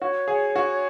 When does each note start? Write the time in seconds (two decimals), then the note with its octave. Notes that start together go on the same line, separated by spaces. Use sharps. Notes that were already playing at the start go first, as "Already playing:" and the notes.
0.01 F#4 C#5
0.28 G#4
0.56 F#4